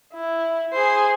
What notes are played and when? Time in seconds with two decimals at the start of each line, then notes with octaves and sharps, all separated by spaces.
0.13 E4
0.72 G#4 C5